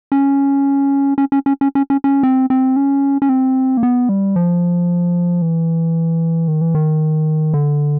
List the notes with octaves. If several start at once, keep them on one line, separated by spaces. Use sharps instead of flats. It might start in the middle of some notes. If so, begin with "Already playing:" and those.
C#4
C#4
C#4
C#4
C#4
C#4
C#4
C#4
C4
C4
C#4
C#4
C4
A#3
B3
G3
F3
E3
D#3
E3
D#3
D3